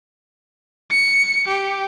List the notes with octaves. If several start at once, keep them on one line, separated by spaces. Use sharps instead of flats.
C#7
G4